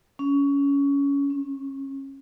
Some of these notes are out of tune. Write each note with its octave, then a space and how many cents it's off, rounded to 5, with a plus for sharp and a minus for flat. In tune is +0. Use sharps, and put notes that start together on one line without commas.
C#4 +20
C#4 -30